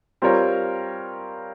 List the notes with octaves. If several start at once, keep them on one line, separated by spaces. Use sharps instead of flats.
G3 C4 F4 A#4 C#5